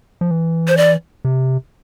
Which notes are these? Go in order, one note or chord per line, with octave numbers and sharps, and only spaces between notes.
F3
E3
C5
D5
C3